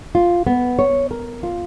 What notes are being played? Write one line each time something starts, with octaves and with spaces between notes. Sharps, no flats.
F4
B3
C#5
A#4
F4